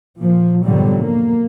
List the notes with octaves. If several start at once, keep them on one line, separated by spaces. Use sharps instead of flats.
A#2 F3
F2 G#2 B2 D3 F#3 G3
A#3